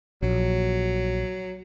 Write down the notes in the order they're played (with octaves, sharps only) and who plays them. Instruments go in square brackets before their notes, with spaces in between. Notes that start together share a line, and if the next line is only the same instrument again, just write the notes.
[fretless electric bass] A#1 [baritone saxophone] F#3